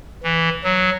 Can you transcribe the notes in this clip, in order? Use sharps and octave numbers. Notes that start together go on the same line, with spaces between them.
E3
F#3